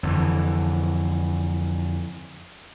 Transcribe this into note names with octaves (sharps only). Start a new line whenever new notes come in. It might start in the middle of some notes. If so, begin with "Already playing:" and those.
F2 D3 E3